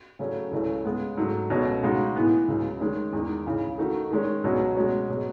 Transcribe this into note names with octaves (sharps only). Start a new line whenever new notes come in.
C#3 F#3 A3 C#4 G#4
C#2 C#3 E3 A3 C#4
C#3 G#3 B3
G#2 F#3 A3
C#2 B2 A3 C#4
C#3 G#3 D#4 F#4
A2 E3 B3
C#2 C#3 F#3
D#3 G#3 C#4
E2 D#3 G#3 D#4
C#2 C#3 E3
D#3 A3 D#4 F#4
D#3 G#3 C#4
C#2 B2 F#3 C#4
B2 G#3 C#4 F#4
B2 F#3 C#4